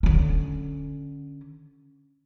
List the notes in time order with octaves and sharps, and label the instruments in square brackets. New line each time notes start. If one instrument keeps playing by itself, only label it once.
[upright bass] D3 C#4